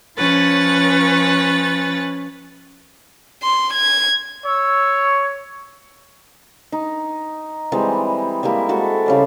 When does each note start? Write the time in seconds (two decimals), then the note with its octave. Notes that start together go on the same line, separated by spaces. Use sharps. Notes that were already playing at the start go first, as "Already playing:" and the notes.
0.17 F3 C#4 B4 C#5 A6
3.43 C6
3.74 G#6
4.46 C#5 E6
6.72 D#4
7.72 E3 G3 G#3 C4
8.43 G3 G#3 A#3 E4
8.69 G#3 F#4 A4
9.06 C#3 G3 D5